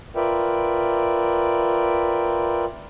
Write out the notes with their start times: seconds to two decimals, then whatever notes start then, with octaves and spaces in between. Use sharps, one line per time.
0.16 F4 A#4 B4 D5 E5 G5